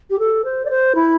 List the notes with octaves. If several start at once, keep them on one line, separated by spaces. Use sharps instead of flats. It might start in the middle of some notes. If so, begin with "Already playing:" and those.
G4
A4
C5
D5
C5
E4